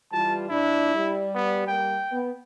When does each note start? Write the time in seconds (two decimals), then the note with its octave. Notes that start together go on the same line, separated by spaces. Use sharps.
0.12 E3 G3 F4 A5
0.49 A#2 D4 E4
0.95 G3
1.35 B3
1.67 G3 A#3 G5
2.11 B3